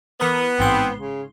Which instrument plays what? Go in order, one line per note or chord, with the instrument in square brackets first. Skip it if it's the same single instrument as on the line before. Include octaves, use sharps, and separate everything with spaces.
[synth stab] E3 A#4 D#6 [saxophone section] B3
[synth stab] A1 G#2 C6 [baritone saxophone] C4
[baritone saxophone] C#3